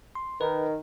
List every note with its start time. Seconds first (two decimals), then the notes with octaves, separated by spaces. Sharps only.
0.15 C6
0.41 D#3 B4